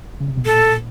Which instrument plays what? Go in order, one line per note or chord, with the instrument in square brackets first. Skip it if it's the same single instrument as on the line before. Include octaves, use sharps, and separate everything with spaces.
[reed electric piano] C#3
C3
B2
[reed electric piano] A#2 [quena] A4